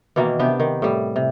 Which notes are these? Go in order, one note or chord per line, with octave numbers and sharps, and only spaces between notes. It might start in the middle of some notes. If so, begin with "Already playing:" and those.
B2 D#3 E3 A#3
C3 B3 D4 G4
D#3
A2 G3
C3